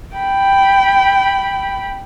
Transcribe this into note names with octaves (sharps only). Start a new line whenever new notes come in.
G5 B5